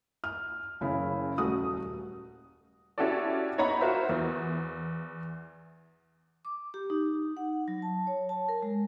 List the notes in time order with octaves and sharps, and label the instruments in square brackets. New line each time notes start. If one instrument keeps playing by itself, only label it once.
[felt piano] F6
F#1 C#3 E4
D#1 A3 F#4 D#6
[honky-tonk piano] C#4 E4 F#4 G4 A4 D5
D#4 C#5 F#5 A#5 B5 C#6
F4 F#4 A#4 C5 E5
E2
[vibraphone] D6
G4
D#4
F#5
F#3
A5
C#5
A5
A#4
G#3